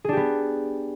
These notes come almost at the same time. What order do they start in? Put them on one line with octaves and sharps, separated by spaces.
G#4 D4 G4 B3